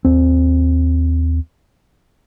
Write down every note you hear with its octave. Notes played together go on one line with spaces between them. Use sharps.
D#2 C4